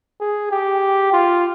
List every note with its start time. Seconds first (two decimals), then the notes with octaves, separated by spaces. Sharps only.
0.21 G#4
0.51 G4
1.13 F4